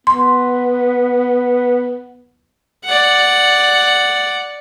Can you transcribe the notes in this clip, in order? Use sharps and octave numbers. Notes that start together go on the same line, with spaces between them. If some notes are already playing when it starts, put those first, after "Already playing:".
B3 C6
D5 F#5